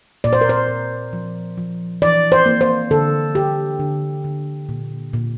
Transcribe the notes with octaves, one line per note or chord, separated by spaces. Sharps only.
A#2 D5
C5
A#4
C5
A#2
F3
F3
E3 D5
C5
A#3
C5
D3 A4
A#3 G4
D3
D3
A#2
A#2